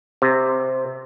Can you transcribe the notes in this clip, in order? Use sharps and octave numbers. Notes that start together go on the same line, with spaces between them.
C3